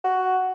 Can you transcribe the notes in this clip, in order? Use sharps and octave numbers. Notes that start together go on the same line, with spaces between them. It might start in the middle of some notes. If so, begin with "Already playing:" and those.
F#4